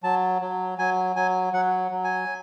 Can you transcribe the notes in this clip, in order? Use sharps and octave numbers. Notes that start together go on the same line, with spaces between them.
F#3 A5
F#3
F#3 G#5
F#3 G#5
F#3 F#5
F#3
G#5